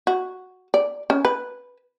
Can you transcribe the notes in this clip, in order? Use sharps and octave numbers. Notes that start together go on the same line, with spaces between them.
F#4
D5
C#4
B4